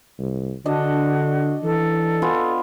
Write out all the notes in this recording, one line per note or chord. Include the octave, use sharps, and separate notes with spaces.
C2
D3 D4 F#4 D#5 A5
E3 A4
B3 F4 G#5